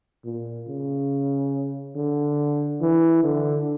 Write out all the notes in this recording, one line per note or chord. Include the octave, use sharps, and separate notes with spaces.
A#2
C#3
D3
E3
D3